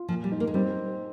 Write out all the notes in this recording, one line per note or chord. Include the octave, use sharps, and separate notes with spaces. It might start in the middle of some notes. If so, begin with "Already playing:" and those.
Already playing: F4
A#2 F3
G3
D#4
A#3
G#3
G3 C4